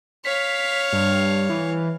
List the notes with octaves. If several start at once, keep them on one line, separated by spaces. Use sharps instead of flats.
C#5 F5 B6
G2
E3